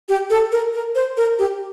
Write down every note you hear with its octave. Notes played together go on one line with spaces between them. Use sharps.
G4
A4
A#4
A#4
C5
A#4
G4